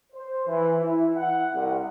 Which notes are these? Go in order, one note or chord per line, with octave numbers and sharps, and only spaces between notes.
C5
E3
E4
F#5
C2